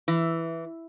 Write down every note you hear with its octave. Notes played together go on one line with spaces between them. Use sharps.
E3